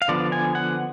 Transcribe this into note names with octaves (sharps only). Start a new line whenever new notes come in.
F5
D3 F3 B3 D5
G#5
F#5